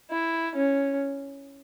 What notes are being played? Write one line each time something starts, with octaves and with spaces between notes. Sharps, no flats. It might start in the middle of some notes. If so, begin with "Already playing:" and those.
E4
C#4